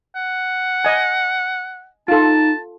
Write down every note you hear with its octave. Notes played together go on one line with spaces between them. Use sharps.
F#5
D#5 G#5
D#4 F4 A4 A5